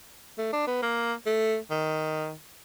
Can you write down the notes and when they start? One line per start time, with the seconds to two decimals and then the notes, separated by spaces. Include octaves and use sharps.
0.38 A3
0.53 D4
0.67 B3
0.83 A#3
1.26 A3
1.71 D#3